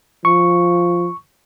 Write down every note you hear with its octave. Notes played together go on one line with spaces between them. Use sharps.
F3 C#6